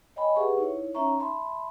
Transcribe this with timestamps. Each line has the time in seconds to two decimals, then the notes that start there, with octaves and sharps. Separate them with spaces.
0.16 C#5 D#5 G5 G#5 B5
0.36 G4 G#4 B4 E5 F#5 C#6
0.58 D#4 E4 C#5
0.95 C#4 D#4 C#5 E5 A#5 C#6
1.19 E5 A5 B5 C6